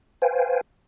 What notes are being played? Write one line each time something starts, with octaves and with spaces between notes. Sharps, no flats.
B4 C5 F5 G5 G#5